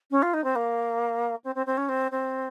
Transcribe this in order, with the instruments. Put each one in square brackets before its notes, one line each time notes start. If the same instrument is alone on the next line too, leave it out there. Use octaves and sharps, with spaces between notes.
[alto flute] C#4
F4
D#4
C4
A#3
C4
C4
C4
C#4
C4
C4